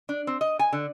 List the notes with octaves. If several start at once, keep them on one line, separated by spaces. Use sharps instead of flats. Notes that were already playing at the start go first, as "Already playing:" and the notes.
D4
C4
D#5
G#5
D3